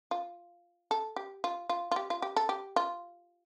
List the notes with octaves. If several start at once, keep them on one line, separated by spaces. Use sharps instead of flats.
F4
A4
G4
F4
F4
F4
G4
F4
G4
A4
G4
F4